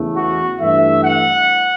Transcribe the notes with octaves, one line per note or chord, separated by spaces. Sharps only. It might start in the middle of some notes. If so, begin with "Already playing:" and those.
Already playing: E2 C#3 E3 A3
F#4
G2 E3 A3 E5
F#5